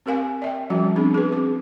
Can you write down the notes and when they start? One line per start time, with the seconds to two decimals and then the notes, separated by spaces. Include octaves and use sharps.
0.06 C4 G4 A#4 F5 G#5
0.42 D5 E5 G5
0.70 F3 G3 C#4 F#4
0.96 B3 C4 D4 G#4
1.14 G#4 B4
1.32 C4 D6